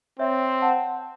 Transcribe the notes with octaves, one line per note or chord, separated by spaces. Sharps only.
C4 C#5 E5
F#5 A5